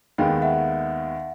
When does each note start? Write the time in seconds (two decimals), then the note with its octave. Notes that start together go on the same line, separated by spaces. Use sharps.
0.18 D#2 D#3 G#3 B3 F5 G5
0.42 E5 F#5